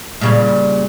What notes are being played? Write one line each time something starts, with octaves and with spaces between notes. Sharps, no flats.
A#2 C#3 G3